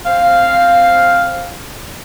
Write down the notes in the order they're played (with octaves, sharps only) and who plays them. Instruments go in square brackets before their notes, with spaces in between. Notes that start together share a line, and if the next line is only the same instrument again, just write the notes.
[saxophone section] C4 C5 F5